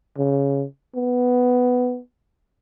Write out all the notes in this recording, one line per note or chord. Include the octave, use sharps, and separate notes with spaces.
C#3
B3